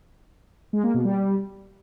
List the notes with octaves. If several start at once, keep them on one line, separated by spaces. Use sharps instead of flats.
G#3
A#3
B2
G3